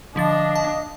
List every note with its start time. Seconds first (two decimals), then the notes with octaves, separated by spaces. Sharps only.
0.16 D3 F3 D4 D#5 F5 D#6 A6
0.55 A5